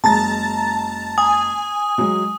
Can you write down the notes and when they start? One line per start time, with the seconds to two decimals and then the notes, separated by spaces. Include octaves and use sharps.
0.04 F#1 G#3 A5 A#5 A6
1.18 G#5 D#6
1.98 F#3 G#3